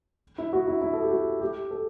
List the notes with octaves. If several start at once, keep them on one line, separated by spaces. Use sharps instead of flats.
E4
F#4
E4
E4
A4
G4
F#4
G4
A4